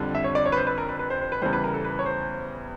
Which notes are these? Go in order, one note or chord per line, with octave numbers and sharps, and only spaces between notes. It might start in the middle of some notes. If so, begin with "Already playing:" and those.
Already playing: F2 D3 G3
E5
C#5
D5
C#5
B4
C5
B4
A#4
B4
B4
C5
C5
B4
E2 C#3 E3 G3 C5
B4
A#4
A4
B4
C#5
C5